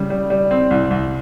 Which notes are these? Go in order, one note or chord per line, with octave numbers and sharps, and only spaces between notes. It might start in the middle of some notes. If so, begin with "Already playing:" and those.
Already playing: C#3 G3
G3
G3
C4
C2
C2